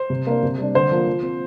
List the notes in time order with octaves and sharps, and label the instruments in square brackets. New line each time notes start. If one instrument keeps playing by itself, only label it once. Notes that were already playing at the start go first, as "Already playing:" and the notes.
Already playing: [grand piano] C5
C3
A#3 D4
C3
G3 D4
D3 C5
F3 A#3
F3
C4